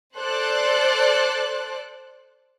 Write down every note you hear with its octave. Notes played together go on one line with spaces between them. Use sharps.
A4 C5 D5 F#6